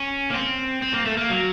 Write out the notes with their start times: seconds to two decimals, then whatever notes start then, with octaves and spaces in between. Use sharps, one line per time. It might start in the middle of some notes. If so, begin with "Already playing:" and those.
Already playing: C#4
0.30 A#3
0.34 C4
0.82 C4
0.94 A#3
1.05 A3
1.17 A#3
1.30 F#3